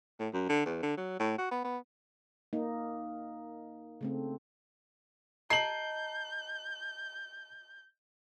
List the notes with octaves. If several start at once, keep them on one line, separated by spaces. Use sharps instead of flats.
A2
F#2
D3
E2
D3
F#3
A2
F#4
B3
B3
A#3 D#4
C#3 A3 C4
D#5 A5 A#5 G6 C7 F#7